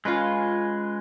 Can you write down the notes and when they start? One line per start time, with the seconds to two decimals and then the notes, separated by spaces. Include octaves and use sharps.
0.05 G#3 C#4 F4 B4